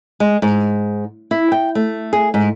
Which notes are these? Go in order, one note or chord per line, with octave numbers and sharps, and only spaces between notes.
G#3
G#2
E4
G5
A3
G#4
G#2